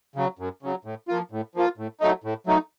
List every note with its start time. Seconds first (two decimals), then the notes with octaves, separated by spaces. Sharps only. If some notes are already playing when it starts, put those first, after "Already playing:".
0.16 C#3 F#3
0.39 F#2
0.63 C#3 F#3
0.85 A2
1.08 F3 A#3 F4
1.31 A2
1.55 F3 A#3 F4
1.78 A2
2.00 F#3 A3 D#4
2.24 A2
2.47 F#3 A3 D#4